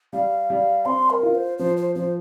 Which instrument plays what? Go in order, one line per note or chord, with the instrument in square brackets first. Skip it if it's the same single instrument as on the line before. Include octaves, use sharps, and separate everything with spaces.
[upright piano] G3 [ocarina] F5
[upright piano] G3
[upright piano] C4 [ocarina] C6
[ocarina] A#4
[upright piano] F4
[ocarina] C5
[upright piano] F3 [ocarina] C5
[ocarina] C5
[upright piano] F3 [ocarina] C5